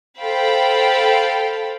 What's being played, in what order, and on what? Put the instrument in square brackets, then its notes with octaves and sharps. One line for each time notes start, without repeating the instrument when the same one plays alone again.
[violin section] A4 C5 F5 G5 B5